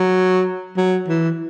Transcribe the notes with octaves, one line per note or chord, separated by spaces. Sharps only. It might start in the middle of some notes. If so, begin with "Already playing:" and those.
Already playing: F#3
F#3
E3